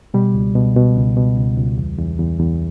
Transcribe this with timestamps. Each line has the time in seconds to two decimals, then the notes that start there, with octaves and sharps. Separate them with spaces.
0.14 B2 G3
0.35 C#2
0.55 B2
0.76 B2
0.96 C#2
1.17 B2
1.37 C#2
1.57 C#2
1.78 E2
1.99 E2
2.19 E2
2.40 E2